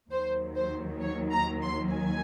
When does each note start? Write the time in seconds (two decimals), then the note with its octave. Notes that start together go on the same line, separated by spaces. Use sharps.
0.11 D#2 D#3 F#3 C5
0.56 C5
1.02 C#5
1.32 A#5
1.62 C6
1.92 G#5